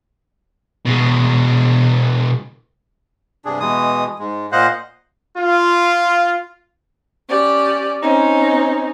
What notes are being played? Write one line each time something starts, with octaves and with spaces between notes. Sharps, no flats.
B2 G#3
G2 C3 D4 G#4
B2 E3 G#3 D#6
G#2 G#3
A#2 C5 D#5 F5 F#5 F#6
F4
C#4 G4 D5
C4 C#4 D#4